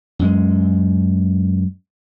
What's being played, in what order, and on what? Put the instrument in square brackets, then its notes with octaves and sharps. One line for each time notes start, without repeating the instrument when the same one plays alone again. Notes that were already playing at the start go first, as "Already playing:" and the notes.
[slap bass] F#2 G#3